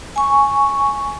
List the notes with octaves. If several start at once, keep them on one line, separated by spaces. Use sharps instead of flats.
G#5 C#6